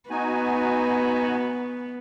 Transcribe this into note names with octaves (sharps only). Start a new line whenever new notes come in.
B3 D#4 F#4 G#5